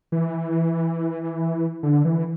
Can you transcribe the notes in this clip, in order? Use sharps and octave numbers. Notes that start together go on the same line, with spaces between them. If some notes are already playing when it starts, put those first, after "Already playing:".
E3
D3
E3